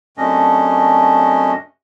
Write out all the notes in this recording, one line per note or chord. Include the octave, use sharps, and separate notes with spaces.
F#2 C3 A3 C#4 D4 D#5